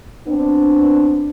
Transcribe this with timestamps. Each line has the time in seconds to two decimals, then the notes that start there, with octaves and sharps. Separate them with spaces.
0.28 B3 C4 D4